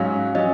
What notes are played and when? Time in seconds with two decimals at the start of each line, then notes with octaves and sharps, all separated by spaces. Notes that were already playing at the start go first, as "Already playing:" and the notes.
Already playing: G#2 F#3 C#4 F5
0.35 F#3 C#4 D#5